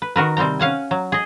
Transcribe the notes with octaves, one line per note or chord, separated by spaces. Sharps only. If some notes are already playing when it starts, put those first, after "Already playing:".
B4
D#3 F#4 A#4 B4
C3 G3 C4 G5 A#5
C#4 F5 F#5 G#5
F#3
G#4 D#5